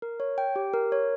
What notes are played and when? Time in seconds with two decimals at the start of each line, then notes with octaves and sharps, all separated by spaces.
0.02 A#4
0.20 C#5
0.38 G5
0.56 G4
0.73 A#4
0.92 C#5